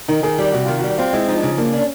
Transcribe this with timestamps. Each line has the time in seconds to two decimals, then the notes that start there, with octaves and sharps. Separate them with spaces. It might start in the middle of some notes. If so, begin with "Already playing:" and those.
0.08 D#3 D#4
0.23 D#3 G#4
0.38 G3 G4
0.52 C3 F#4
0.65 D#3 F4
0.79 G3 F#4
0.98 C4 F4
1.13 G#3 E4
1.28 F3 D#4
1.37 D4
1.43 C#3 D#4
1.58 A#3 D4
1.73 C#4 D4